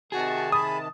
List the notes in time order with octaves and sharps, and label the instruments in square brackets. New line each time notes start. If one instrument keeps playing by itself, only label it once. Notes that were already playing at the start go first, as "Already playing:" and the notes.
[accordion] C3 D#3 A5 [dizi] F#4 [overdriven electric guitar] G#4
[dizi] B5 [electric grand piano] D#6